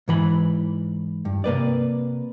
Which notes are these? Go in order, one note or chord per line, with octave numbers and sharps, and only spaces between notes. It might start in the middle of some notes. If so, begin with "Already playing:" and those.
G#2 E3 B5
G2
C3 A#3 B4 D5